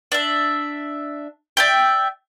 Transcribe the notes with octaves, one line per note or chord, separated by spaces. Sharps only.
D4 E5
D5 E5 G5